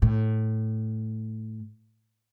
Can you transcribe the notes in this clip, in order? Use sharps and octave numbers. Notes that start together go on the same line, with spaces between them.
A2